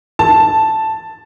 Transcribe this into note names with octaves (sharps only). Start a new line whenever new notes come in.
A5